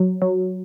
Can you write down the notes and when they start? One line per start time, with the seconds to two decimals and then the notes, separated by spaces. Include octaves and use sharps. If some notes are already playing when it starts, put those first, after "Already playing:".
Already playing: F#3
0.22 F#3